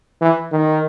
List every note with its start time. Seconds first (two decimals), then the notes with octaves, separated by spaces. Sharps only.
0.21 E3
0.52 D#3